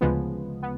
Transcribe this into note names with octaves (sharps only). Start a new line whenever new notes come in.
D2 C#3 F3 G#3 B3
B3